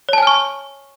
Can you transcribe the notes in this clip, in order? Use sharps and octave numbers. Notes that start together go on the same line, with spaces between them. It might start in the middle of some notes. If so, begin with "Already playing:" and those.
C#5 G#5 A5 C#6 F6